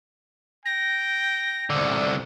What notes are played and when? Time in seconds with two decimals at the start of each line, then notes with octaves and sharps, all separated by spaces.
0.66 G5 A#6
1.70 C2 D3